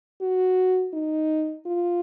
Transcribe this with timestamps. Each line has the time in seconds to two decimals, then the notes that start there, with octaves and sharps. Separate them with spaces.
0.22 F#4
0.94 D#4
1.66 F4